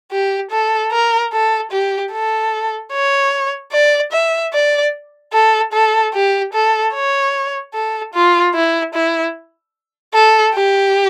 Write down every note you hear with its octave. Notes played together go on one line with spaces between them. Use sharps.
G4
A4
A#4
A4
G4
A4
C#5
D5
E5
D5
A4
A4
G4
A4
C#5
A4
F4
E4
E4
A4
G4